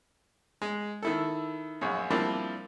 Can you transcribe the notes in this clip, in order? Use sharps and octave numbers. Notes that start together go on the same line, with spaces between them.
G#3
D#3 E4 A4
A#1 F#2
F3 G3 A#3 C4 D4 E4